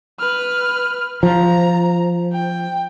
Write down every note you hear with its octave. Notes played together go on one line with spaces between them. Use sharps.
B4 F6
F3 A#5
G5